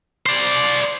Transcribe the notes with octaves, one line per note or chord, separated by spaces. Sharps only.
C5 D5